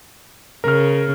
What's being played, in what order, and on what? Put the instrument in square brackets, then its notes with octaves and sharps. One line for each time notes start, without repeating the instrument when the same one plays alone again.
[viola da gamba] C#3 [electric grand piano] A#4 F6